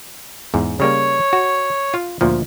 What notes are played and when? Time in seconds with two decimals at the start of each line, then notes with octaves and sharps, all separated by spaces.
0.54 E2 G#2
0.80 C#3 G3 A#3 C#5
1.33 F#4
1.94 F4 F5
2.21 D2 A#2 F3